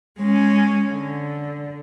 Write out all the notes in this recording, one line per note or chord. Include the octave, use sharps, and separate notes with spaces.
G#3 C#4
D3